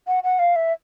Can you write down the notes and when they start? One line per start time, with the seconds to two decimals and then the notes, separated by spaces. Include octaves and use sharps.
0.07 F#5
0.23 F#5
0.39 F5
0.56 E5